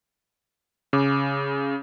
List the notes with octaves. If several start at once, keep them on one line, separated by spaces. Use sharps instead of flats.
C#3 D6